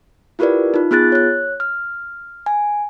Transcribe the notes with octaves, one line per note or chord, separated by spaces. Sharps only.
E4 F4 G4 A#4 B4 D5
D#4 F4
B3 F4 G#4 F#6 A6
C#5 F#6
F6
G#5